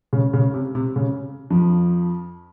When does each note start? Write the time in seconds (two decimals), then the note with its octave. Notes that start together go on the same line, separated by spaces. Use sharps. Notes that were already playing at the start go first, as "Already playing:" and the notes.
0.13 C#3
0.33 C#3
0.54 C3
0.75 C3
0.96 C#3
1.50 F2 F3